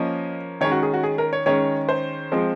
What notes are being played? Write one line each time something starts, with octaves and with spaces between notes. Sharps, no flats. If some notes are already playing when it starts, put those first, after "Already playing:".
Already playing: F3 A#3 C#4 D#5
D#3 G#3 C#4 C#5
F#4
G#4
F#4
G#4
A#4
C#5
D#3 G#3 C#4 C#5
C5
F3 G#3 C4